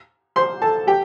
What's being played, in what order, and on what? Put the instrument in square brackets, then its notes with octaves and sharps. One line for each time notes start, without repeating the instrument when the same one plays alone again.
[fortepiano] C5 C6
A4 A5
G4 G5